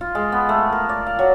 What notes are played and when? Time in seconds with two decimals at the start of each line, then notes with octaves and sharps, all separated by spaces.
0.01 F4
0.15 G#3
0.32 B3
0.49 A3
0.72 A#4
0.89 D5
1.07 F5
1.19 F#3